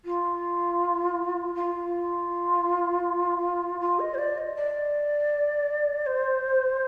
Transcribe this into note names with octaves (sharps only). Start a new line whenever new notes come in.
F4
F4
F4
D#5
C5
D5
D#5
D5
C5